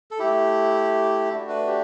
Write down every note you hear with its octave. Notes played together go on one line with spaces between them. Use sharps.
A4
A3 E4 G4
A3 D4 F#4
B4
G4